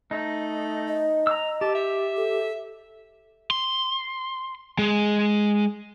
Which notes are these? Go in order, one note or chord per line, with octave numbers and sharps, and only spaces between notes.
A3 D#4
D#5
A#5 E6
G4 A5
E5
A4
C6
G#3